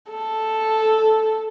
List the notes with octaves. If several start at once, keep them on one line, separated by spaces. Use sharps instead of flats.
A4